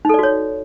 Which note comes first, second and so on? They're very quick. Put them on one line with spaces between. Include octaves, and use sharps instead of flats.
D#4 A4 D5 F#4 C#5